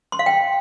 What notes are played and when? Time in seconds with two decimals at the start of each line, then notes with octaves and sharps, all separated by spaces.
0.12 C6
0.19 F5
0.26 G5